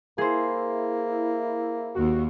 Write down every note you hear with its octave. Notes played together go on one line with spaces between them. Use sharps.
A#3 E4 G#4 C5
D#2 F#4